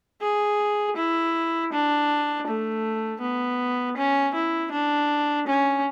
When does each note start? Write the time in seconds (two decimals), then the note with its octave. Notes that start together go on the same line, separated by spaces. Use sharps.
0.22 G#4
0.96 E4
1.72 D4
2.47 A3
3.21 B3
3.97 C#4
4.34 E4
4.72 D4
5.47 C#4